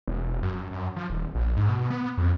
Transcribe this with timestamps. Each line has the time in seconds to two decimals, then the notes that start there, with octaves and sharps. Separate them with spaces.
0.08 E1
0.43 F#2
0.71 F#2
0.96 F3
1.10 D#1
1.35 A#1
1.57 G#2
1.69 B2
1.90 B3
2.18 F2